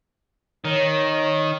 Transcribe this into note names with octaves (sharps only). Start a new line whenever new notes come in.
D#3 C#5